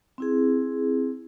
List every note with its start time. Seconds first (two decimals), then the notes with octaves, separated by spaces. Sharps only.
0.18 C4 E4 G#4